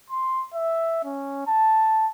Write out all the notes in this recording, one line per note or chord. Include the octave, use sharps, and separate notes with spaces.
C6
E5
C#4
A5